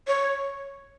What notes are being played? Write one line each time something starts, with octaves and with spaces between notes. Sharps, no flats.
C#5